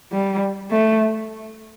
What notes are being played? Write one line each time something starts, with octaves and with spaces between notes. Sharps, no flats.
G3
A3